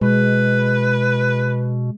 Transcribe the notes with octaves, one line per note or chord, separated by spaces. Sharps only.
B2 G#3 B4